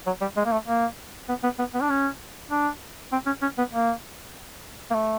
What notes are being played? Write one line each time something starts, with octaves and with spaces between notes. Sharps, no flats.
F#3
G3
G#3
A#3
A3
A#3
B3
B3
B3
B3
D4
C#4
D4
C4
C#4
C#4
B3
A#3
A#3
A3